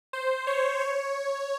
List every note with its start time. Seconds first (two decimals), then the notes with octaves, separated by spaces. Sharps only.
0.13 C5
0.47 C#5
0.80 C#5